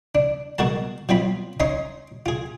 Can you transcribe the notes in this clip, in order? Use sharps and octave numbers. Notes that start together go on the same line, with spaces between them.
D4
B2 G#3 F#4 A#4 A5
B2 F#3 C4 F4 B5
C#4 D#4 C#5 D#5 C6 C#6
F4 G#4